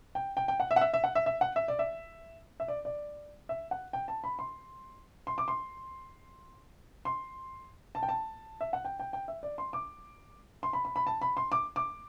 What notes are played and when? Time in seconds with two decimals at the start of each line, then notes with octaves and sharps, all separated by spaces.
0.15 G5
0.37 G5
0.48 G5
0.60 F#5
0.71 E5
0.76 F#5
0.81 E5
0.94 E5
1.04 F#5
1.15 E5
1.26 E5
1.41 F#5
1.56 E5
1.68 D5
1.79 E5
2.60 E5
2.68 D5
2.85 D5
3.49 E5
3.71 F#5
3.93 G5
4.08 A5
4.24 B5
4.39 C6
5.27 C6
5.38 D6
5.48 C6
7.05 C6
7.95 A5
8.03 G5
8.09 A5
8.61 E5
8.73 F#5
8.85 G5
9.00 G5
9.13 G5
9.28 E5
9.43 D5
9.58 C6
9.73 D6
10.63 C6
10.73 B5
10.85 B5
10.96 B5
11.07 A5
11.21 B5
11.37 C6
11.52 D6
11.76 D6